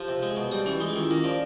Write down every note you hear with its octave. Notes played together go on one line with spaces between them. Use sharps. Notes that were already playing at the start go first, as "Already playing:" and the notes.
Already playing: F3 G4
C3
G#3
B2
G3 G4
E3 C#4
G#3 D#4
F4
D#3 E4
A#3 A#4
F3 D5